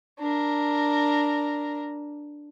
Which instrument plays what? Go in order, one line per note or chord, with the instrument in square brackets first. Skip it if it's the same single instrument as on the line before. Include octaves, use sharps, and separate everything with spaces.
[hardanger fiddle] D4 A#4